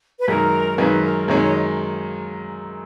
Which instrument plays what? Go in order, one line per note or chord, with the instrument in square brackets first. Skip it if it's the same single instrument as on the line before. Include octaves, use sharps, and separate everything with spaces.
[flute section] B4
[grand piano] F#2 D#3 G#3 [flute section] A#4
[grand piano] F#2 D#3 G#3 [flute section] B4
[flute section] A#4
[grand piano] F#2 D#3 G#3 [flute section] C#5
[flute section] D#5